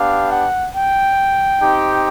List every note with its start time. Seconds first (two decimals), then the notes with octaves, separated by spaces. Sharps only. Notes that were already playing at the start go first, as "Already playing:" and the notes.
Already playing: B3 D4 G4 F5
0.31 F#5
0.73 G5
1.61 C4 D#4 G4